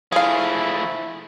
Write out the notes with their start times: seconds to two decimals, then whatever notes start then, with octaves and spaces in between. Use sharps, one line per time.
0.12 F3 A3 E4 G#4 F5